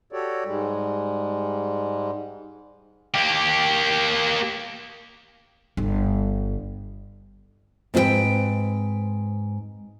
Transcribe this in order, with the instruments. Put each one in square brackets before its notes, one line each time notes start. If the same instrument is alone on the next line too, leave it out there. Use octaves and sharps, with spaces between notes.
[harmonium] F#4 G4 A4 C#5 D5
G#2 G3 G#3
[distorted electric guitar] A#3 G4
[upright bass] G1
[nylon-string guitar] G#2 C4 F4 G#4 B4 G5